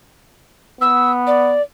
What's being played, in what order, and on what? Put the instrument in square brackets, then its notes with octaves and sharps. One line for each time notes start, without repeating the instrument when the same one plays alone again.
[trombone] B3 [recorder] E6
[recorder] D5